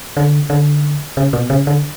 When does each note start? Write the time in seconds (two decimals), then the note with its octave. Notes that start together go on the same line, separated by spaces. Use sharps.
0.17 D3
0.50 D3
1.17 C#3
1.33 B2
1.50 C#3
1.67 D3